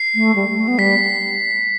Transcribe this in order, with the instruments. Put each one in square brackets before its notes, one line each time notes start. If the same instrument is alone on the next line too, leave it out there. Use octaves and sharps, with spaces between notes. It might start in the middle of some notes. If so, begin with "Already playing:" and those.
Already playing: [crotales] C7
[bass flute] A3
G3
A3
B3
[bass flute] G3 [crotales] B6